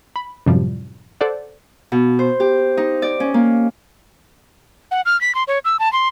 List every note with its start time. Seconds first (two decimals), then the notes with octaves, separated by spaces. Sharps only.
0.16 B5
0.46 F#2 A2 C3 F3 G3
1.21 A4 C5 D5 F#5
1.92 B2
2.19 C5
2.40 G4
2.77 D#4
3.02 D5
3.20 C#4
3.34 A#3
4.91 F#5
5.06 F6
5.21 B6
5.35 C6
5.48 C#5
5.65 E6
5.79 A5
5.93 C6